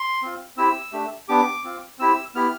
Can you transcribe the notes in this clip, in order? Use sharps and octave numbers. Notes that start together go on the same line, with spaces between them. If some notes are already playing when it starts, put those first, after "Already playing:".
Already playing: C6
C4 F4
C4 E4 G4 E6
A3 D4 G4
B3 D4 G4 D6
C4 F4
C4 E4 G4 E6
B3 E4 G4 F6